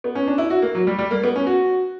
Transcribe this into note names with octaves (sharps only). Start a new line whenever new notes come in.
B3
C#4
D4
E4
F#4
A#3
F#3
G3
G3
A#3
B3
C#4
F#4